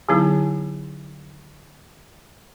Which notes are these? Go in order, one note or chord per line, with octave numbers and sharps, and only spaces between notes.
D3 F#3 B3 D#4 E4